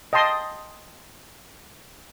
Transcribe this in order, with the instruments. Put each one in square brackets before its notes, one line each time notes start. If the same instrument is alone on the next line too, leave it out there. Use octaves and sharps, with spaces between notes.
[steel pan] D#5 G5 A5 C6 D#6